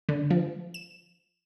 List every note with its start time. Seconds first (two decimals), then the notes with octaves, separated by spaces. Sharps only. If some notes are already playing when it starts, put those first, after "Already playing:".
0.09 D3
0.30 F3
0.74 E7